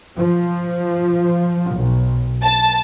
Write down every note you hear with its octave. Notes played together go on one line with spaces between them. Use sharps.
F3
B1
A5